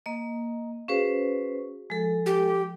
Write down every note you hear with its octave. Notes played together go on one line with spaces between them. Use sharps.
A#3 D#5
C#4 F#4 G#4 B4 C5 F5
F3 G#3 A4
G4